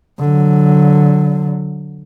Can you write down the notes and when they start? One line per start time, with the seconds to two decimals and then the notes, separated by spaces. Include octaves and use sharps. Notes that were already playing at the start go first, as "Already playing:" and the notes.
0.19 D3 F#3